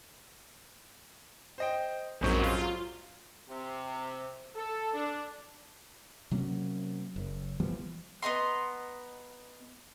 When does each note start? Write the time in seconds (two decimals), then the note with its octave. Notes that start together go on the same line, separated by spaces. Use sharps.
1.58 C5 D#5 G5
2.21 A#1 F2 G#2 F#3 C#4 G6
2.43 F4
3.49 C3
4.56 A4
4.94 D4
6.31 C3 F#3 A#3 C#4
7.16 F#1
7.60 E3 F3 G3 B3
8.22 B3 D#5 A#5 C6